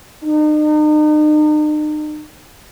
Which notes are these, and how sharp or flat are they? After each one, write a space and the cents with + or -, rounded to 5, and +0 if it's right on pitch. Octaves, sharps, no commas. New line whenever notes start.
D#4 -40